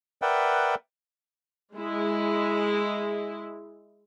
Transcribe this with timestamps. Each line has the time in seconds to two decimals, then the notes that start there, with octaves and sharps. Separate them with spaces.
0.22 A#4 B4 D5 E5 F#5 G5
1.75 G#3 E4